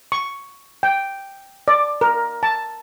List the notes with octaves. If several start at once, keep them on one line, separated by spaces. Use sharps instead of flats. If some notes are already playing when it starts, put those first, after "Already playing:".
C#6
G5
D5
A#4
A5